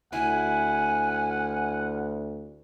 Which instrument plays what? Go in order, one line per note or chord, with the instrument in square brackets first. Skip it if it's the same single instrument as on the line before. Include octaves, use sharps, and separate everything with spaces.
[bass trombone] D2 [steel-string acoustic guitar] E4 [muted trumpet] F#5 [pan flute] G#5